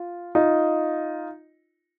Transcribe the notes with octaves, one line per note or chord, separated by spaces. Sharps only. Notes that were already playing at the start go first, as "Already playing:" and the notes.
Already playing: F4
D#4 F4